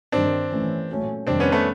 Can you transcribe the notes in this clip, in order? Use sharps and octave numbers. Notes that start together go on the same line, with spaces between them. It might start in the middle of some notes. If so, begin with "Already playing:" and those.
G2 D#3 G3 C4 D4
A2 E3 A3 C#4
A#2 F#3 A3 C#4
F2 C3 D#3 G3 C4 D4
B3 C#4
A3 B3